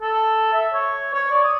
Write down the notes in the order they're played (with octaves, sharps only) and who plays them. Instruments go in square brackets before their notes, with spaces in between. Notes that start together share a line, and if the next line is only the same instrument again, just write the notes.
[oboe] A4
E5
C#5
C#5
D5
D#6